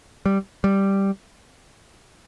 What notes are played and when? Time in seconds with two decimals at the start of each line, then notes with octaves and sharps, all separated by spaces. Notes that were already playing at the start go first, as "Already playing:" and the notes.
0.26 G3
0.64 G3